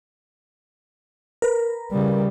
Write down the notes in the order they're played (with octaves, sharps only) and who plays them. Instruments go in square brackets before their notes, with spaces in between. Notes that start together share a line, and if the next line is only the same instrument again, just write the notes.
[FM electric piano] A#4 B4
[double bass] C#3 G3